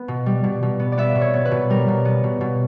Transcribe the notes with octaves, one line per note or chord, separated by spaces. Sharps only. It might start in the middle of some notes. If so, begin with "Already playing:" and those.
Already playing: B3
B2
G3
B2
B2
B3
D5
B3 E5
B2
C#5
B3
B4
B2
G3 A#4
B2
B3
B2
B2